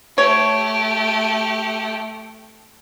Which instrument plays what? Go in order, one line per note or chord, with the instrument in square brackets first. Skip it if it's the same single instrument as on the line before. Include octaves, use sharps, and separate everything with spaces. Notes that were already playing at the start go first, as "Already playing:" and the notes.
[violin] A3 G4 [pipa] C#5